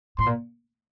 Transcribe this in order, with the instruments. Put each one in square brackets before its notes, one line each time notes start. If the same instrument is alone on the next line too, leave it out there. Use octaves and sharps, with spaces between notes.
[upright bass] A2 [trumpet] C6
[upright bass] A#2